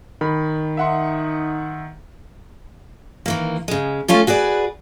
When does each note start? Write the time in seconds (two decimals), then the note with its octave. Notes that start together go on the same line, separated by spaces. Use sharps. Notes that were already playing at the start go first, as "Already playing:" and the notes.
0.21 D#3 B5
0.77 D#4 E5 F#5 C6
3.26 D#3 E3 A#3
3.68 C#3 G#3
4.08 A3 C#4 F4 A4
4.27 F#4 G#4 B4 D5